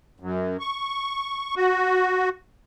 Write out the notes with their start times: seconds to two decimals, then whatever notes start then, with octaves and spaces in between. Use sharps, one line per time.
0.20 F#2
0.60 C#6
1.56 F#4